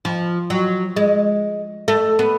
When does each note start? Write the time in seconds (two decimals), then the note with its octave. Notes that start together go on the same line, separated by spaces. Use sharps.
0.05 F3
0.50 F#3
0.96 G#3
1.88 A3
2.19 B3